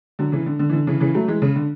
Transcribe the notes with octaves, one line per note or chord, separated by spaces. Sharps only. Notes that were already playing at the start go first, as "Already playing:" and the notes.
D3 F#3
C#3 E3
D3
D3
E3
D3
C#3 E3
C#3 E3
F#3 A3
E3 G#3
C#3
D3